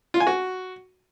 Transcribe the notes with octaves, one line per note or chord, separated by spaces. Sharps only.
F4
G#5
F#4